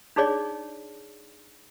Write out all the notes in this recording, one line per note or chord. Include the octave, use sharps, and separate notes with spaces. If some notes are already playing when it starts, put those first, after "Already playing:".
D4 D#4 G#4 C#5 D5